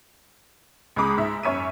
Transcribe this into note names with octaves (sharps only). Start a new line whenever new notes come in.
C#2 G#3 A#5 B5 D6 D#6
G#2 E5
F#2 C#5 E5 D#7